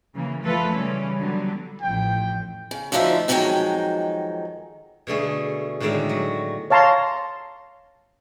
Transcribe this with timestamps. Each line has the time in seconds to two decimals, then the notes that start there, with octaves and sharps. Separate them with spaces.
0.14 C#3 E3 A#3
0.43 F3 A3 F4 A4 B4
0.72 C#3 E3 G3 C#4
1.18 D3 F#3 G3 B3
1.82 A1 F2 G5
2.71 C#3
2.92 D2 F3 D4 D#4 F4 E5
3.28 F2 A2 D#3 F#3 G#3 G5
5.07 B2 D3 A3 G#4
5.80 A2 D3 D#3 G#3 D5 E5
6.09 F#3
6.70 C#5 F5 A5 A#5 C6